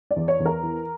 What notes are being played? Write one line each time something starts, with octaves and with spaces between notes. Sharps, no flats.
D5
E2
C#5
E2
A#4
E3